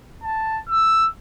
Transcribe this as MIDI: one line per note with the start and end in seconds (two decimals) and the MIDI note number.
0.23 0.59 81
0.68 1.07 88